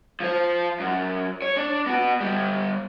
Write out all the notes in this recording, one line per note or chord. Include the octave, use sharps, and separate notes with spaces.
F3 C5
F#2
C#5
D4
B3 F#4
G3 B3